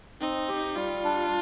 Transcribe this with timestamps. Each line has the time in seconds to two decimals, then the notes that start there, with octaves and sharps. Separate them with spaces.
0.20 C4 D#4
0.48 G4
0.76 G3 F4
1.04 D4